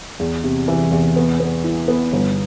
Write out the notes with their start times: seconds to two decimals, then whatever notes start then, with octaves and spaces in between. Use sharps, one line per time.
0.19 E2
0.44 C3
0.68 E3
0.91 E2
1.16 B3
1.40 B3
1.64 E4
1.88 B3
2.13 G1